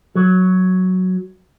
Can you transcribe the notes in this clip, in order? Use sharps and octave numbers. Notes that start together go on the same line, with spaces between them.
F#3